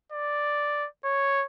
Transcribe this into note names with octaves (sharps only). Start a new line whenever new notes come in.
D5
C#5